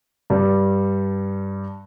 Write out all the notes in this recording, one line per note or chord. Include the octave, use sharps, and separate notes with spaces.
G2 G3